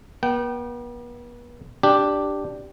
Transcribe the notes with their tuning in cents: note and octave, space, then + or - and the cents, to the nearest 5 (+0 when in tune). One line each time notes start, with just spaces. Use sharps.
B3 -45 G5 -30
D4 +0 G4 +0